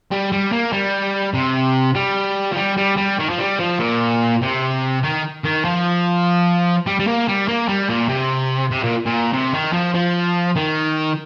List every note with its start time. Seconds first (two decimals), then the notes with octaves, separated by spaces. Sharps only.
0.12 G3
0.32 G3
0.52 A#3
0.72 G3
1.34 C3
1.95 G3
2.52 F3
2.56 G3
2.77 G3
2.97 G3
3.19 D#3
3.30 F3
3.39 G3
3.59 F3
3.79 A#2
4.42 C3
5.03 D#3
5.44 D#3
5.65 F3
6.87 G3
7.00 G3
7.07 A#3
7.28 G3
7.48 A#3
7.68 G3
7.89 A#2
8.09 C3
8.71 C3
8.83 A#2
9.05 A#2
9.33 C3
9.53 D#3
9.73 F3
9.94 F3
10.56 D#3